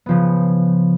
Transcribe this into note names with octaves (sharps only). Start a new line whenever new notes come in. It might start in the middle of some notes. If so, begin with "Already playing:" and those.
C#3 F3 B3